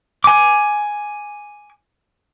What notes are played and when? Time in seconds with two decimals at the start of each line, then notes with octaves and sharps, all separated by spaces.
0.24 G#5 D6